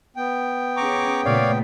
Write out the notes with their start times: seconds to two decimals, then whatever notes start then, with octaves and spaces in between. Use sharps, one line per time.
0.17 B3 G5
0.77 C#4 G#4 A#5 C#6 D6
1.25 A#2 C#3 A3 C#5 D5 F5